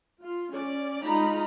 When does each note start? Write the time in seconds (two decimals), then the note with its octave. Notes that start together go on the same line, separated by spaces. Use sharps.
0.20 F4
0.52 C#4 D5
1.04 G#3 D#4 F4 A#5 B5